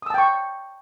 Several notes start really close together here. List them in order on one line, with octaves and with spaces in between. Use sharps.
D#6 E6 A5 G5 C#6